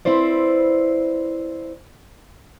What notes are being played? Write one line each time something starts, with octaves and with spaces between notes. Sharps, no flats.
C4 E4 B4 C5 D5